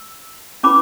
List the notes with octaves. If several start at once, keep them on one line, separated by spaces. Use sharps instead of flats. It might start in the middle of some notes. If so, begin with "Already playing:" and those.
Already playing: E6
C#4 E4 B4 B5 D6